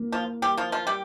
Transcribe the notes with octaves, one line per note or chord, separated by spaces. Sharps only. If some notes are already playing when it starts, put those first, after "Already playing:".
Already playing: A#3
F3 F4
G3 G4
F3 F4
F3 F4
G3 G4